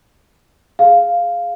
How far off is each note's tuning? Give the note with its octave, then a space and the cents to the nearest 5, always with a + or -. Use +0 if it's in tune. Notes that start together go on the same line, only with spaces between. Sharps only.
G#4 +0 F5 +0